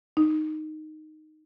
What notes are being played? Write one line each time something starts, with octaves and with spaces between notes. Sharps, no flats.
D#4